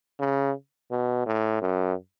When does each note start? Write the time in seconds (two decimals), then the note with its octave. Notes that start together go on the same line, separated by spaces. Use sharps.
0.20 C#3
0.91 B2
1.26 A2
1.61 F#2